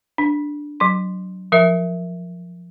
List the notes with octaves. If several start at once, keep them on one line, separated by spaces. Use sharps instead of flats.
D4
F#3 C6
F3 A#4 E5